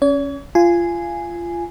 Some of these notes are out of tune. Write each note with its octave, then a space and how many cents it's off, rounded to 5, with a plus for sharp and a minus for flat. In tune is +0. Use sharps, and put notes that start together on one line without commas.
C#4 +0 C#5 +45
F4 -20 G#5 +0